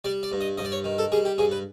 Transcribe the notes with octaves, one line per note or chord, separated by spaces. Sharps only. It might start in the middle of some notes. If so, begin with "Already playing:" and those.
G3 D5
D5
G2
D#5
G2 D#5
D5
C#5
D#3
A4
G3 G#4
G4
G2 G#4
B4